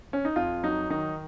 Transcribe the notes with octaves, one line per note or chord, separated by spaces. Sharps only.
C#4
D#4
F2 F4
F#3 D#4
D#3 D#4